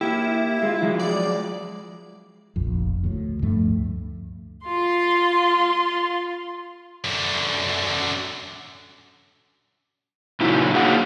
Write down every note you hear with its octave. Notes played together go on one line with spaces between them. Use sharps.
A#3 E4 G4
G#3 F4
F3 F#3 G#3
D5
F1 A#1 F2
D2 A2
D2 G2 F3 A3
F4 C6
F#2 D3
A#2 C#3 F#3 D#4 E4
F#3 A#3 D4 G#4 F5 F#5